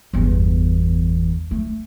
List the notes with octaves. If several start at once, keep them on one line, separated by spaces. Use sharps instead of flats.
G1 E2
A3